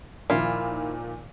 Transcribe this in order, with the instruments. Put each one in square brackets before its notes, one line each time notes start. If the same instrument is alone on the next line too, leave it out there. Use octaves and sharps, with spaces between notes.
[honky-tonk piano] A#2 D#3 F3 [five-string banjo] E4 F4